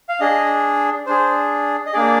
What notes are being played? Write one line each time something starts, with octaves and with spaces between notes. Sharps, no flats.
F5
D4 G#4 D#5
D4 G#4 C5
D#5
A#3 D4 G#4 D5